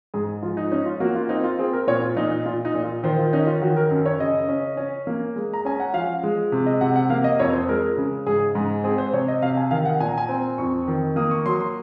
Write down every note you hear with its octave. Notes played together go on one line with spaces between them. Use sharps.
G#2 G#4
F3 F4
D#4
C#4 D#4
F4
A#3 F#4
F4
C4 D#4
F4
C4 G#4
A#4
A#2 C#5
F4
A#2 D#4
D#4
A#2 F4
D#4
A#2
F4
D#3 C5
F4
C#4 D#4
F4
D#3 F#4
A#4
F#2
C#5
C#3 D#5
C#4
C#4
A#3
G#3
A#5
C#4 G#5
F#5
F3 F5
G#3
C3
D#5
C3 F#5
F#5
A#3 F5
D#5
F2 C#5
C5
G#3 A#4
C#3
G#2 G#4
G#2
C4 G#4
C5
C3 C#5
D#5
C3 F5
G#5
D#3 F5
F#5
A#2 G#5
A#5
G#5
C4
F2 C#6
D#3
A#3 D#6
C#6
F#3 C6
C6